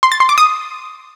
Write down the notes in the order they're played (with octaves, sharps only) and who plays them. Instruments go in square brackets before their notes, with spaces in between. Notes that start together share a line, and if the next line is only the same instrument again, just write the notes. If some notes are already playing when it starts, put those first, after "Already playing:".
[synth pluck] C6
A6
C6
D6
D#6